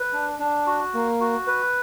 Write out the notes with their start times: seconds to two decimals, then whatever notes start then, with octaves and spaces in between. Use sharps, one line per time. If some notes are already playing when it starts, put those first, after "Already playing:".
Already playing: B4
0.13 D4
0.39 D4
0.67 F#4
0.94 A#3
1.20 F#4
1.47 B4